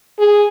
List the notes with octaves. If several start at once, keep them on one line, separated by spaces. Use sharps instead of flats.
G#4